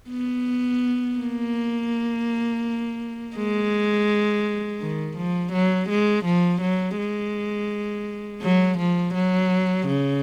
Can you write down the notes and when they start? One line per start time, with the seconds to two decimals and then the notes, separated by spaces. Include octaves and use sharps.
0.10 B3
1.19 A#3
3.36 G#3
4.81 D#3
5.17 F3
5.52 F#3
5.89 G#3
6.25 F3
6.61 F#3
6.98 G#3
8.42 F#3
8.78 F3
9.14 F#3
9.87 C#3